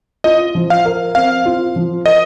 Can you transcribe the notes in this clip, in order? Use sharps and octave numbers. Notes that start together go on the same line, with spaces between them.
F4 D#5
F3
F5
A#4
C4 F5
F4
F3
A#4 D#5